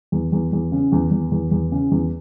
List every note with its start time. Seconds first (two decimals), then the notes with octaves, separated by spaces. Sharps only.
0.12 E2
0.32 E2
0.53 E2
0.72 C#3
0.92 E2
1.11 E2
1.32 E2
1.51 E2
1.72 C#3
1.91 E2